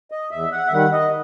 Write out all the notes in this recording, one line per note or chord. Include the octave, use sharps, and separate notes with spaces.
D#5
E2 E5
F#5
E5
D#3 G3 F#5
D#5